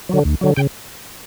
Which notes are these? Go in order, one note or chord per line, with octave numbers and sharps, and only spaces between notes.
D3 F#3
D2
D3 F#3
C#3 G5